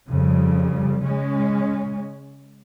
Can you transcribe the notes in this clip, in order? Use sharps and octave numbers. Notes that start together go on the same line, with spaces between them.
F2 C#3 G3
C#3 G#3 C#4